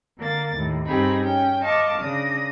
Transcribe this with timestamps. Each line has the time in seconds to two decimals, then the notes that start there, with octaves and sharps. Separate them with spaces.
0.18 D3 A#3 A6
0.55 D#2 A2
0.87 G2 C4 D#4 G4 G#4 B5
1.21 C#4 G5
1.61 D#5 F5 A5 C#6 D6
1.98 C#3 D4 D#6 A#6